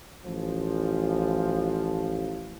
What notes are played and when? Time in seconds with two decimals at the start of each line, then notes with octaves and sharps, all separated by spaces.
0.24 A1 F3